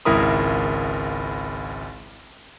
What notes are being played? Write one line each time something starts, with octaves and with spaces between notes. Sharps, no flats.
G#1 C#2 E4 A#4 B5 D#6